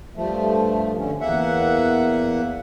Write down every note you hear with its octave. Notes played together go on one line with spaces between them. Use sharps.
G2 F3 A3
D3 C#4
E2 A#3 E5 F#5